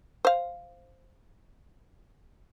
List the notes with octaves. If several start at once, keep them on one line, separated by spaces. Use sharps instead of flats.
C5 F5